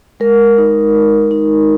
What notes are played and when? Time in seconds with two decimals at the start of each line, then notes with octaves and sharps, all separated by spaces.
0.20 G#3 A#4
0.58 D#4
0.95 G#3
1.31 D#4